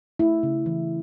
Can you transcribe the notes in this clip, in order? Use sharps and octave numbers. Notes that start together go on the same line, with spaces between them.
A3 E4
C#3
E3